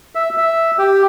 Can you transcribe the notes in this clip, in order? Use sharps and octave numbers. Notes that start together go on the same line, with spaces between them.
E5
E5
G4